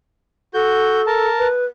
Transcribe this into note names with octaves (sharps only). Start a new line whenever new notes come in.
F#4 A4 G6
A#4 A5
B4